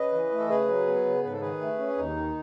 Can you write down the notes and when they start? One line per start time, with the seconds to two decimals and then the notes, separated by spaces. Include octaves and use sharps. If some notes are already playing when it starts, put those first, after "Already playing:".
Already playing: C#3 B4 D#5
0.13 E3
0.32 A3
0.39 A4
0.49 C#3 G#4 B4
0.68 F#3
0.87 B3
1.05 C#3
1.24 G#2 B4
1.33 A4
1.41 D#3 G#4 B4
1.61 A3
1.79 C#4
1.97 D#2 D#4
2.16 D#3